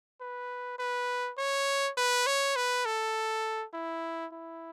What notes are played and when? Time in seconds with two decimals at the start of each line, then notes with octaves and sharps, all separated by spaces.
0.21 B4
0.79 B4
1.38 C#5
1.97 B4
2.27 C#5
2.56 B4
2.86 A4
3.74 E4
4.33 E4